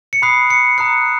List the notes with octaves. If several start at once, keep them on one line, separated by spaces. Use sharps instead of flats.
C#7
B5 D#6 F#6 C7
C#7
A#5 D#6 F#6 C#7